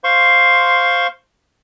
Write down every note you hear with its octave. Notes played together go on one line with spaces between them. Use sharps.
C5 F5 C6 C#6